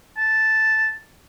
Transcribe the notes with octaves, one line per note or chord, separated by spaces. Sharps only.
A5